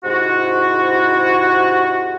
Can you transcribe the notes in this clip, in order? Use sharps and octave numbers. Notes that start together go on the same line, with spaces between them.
G#2 C3 E4 F#4